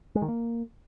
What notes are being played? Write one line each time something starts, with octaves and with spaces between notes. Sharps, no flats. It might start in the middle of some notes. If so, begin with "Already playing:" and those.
G#3
D#3
A#3